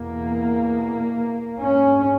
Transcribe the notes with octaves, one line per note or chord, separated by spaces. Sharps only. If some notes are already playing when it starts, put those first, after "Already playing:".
Already playing: E2 B2 A#3
G#2 C#4